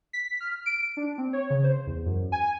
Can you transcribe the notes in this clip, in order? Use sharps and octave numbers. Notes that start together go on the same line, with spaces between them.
B6
F6
D7
D4
C4
C#5
C#3
C5
E2
F#2
G#5